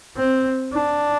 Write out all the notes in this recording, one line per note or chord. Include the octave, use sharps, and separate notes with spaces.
C4
D4